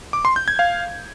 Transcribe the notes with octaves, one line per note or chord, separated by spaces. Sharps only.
D6
C6
G6
G#6
F5